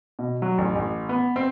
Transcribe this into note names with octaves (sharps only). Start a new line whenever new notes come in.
B2
F#3
A1
A1
B3
C4